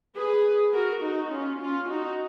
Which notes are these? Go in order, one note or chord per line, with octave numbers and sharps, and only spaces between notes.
G#4 B4
F#4 A#4
D#4 F#4
C#4 F4
C#4 F4
D#4 F#4